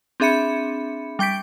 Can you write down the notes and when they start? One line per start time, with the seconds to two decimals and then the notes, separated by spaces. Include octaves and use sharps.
0.20 C4 D4 G#4 E5 B5 C#7
1.19 G3 G5 G6 B6 D7